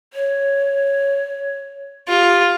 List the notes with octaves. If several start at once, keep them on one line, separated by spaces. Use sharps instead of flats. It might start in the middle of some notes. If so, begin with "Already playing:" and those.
C#5
F4 G4